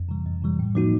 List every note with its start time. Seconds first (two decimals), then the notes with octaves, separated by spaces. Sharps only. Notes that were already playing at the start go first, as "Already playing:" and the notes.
Already playing: F2
0.09 C3 E3 G3
0.26 F2
0.42 C3 E3 G3
0.59 A2
0.75 F3 A#3 D#4 F#4